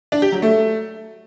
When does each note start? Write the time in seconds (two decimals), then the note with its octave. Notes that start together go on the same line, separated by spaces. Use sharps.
0.12 D4
0.22 G4
0.32 F#3
0.42 A3